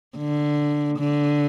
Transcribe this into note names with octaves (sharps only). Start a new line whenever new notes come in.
D3
D3